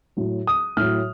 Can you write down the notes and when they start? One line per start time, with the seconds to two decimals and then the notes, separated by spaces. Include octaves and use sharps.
0.17 A2 F#3
0.47 D#6
0.77 A2 F#3 F6